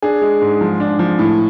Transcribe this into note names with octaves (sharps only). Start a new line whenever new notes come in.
D4 G#4
G#3
G#2
F3
D4
F3
A2